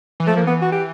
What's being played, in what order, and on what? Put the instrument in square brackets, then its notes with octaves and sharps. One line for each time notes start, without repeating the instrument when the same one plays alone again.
[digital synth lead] E3
[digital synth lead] F3 [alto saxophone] A3
[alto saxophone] A#3
[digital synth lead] E3 [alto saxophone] B3
[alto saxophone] F#4
G4